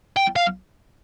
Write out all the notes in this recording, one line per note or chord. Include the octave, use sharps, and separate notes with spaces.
G5
F5